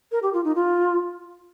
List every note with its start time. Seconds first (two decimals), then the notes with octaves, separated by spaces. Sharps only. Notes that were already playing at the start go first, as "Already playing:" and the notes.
0.12 A#4
0.23 G4
0.33 F4
0.44 D#4
0.55 F4